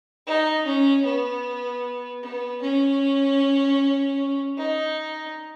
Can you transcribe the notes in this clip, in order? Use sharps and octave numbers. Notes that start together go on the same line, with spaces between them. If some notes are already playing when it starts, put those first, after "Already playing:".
D#4
C#4
B3
B3
C#4
D#4